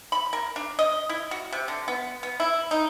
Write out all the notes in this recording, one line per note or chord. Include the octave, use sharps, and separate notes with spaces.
B5
A#4
D4
D#5
E4
F#4
C3
D3
B3
B3
E4
D#4